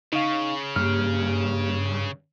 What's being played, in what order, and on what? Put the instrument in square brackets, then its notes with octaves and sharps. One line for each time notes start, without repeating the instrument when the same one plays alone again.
[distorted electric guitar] C#3 [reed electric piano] D#4 F5 [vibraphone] C#6
[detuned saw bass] G2 [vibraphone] A#3 G4 [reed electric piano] F6